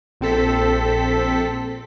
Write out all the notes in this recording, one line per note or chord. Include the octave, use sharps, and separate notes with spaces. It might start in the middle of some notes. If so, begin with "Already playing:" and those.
A#1 C4 A4 B6